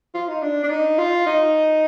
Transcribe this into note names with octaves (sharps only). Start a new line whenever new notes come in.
F4
D#4
D4
D4
D#4
F4
D#4